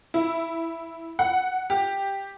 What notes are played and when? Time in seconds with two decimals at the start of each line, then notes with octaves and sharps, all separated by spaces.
0.14 E4
1.19 F#5
1.70 G4